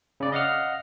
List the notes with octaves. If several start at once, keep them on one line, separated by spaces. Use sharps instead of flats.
C#3 D5
D#5 F5 F#5 F6